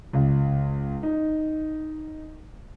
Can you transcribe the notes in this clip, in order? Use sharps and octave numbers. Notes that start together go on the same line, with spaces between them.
C#2
D#4